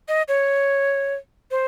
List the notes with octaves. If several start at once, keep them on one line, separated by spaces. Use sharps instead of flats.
D#5
C#5
C5